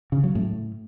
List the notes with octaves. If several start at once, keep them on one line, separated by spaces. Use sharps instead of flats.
C#3
F#3
A2